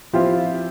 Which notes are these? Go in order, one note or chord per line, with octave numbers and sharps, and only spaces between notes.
F3 C4 E4 F4 G4